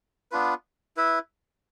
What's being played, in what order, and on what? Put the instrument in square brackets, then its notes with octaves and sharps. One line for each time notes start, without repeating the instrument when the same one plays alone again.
[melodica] B3 D4 F4 B4
E4 B4 E5